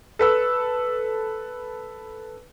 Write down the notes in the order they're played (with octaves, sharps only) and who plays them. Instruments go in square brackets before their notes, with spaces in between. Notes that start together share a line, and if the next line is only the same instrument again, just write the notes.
[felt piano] A4 B4 E6